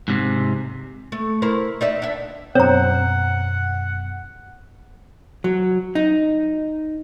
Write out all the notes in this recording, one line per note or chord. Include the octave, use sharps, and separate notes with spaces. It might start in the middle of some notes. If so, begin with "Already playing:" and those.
G#2 C3
A3
E4 A#4 C5
D#4 D5 E5
D4 E5
F#2 B2 C4 C#5 F#5 A#5
F#3
D#4